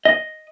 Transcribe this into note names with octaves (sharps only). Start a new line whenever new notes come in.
D#5